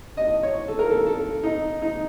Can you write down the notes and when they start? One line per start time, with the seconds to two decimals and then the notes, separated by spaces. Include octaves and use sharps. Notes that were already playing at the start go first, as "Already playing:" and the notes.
0.17 D#5
0.43 C#5
0.68 A4
0.79 A#4
0.91 A4
1.07 A4
1.43 D#4
1.82 D#4